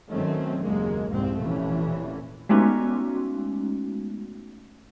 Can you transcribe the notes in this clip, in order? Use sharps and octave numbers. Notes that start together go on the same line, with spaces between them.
F#2 D#3 A3 C4 C#4
F#1 D#2 G#3 A#3
C2 F2 G#2 C4
F1 A#2 E3 A3 C#4
G#3 A3 B3 C#4 D#4 F#4